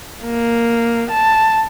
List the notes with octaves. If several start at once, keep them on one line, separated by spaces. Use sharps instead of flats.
A#3
A5